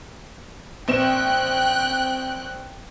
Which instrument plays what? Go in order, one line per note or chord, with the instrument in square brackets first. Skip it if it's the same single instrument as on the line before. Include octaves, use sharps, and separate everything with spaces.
[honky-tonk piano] A#1 C4 E7 [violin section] G5 F#6